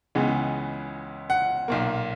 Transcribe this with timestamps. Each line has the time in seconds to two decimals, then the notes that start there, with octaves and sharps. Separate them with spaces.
0.15 C#2 C#3 E3 G#3 B3
1.30 F#5
1.68 B1 A#2 A#3